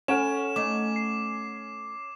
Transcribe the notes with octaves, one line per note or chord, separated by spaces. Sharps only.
C#4 A4 F#5 G#5 E7
A3 D#4 D6
C7